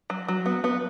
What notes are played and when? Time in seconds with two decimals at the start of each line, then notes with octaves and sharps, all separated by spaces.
0.10 F#3
0.28 F#3
0.46 B3
0.64 B3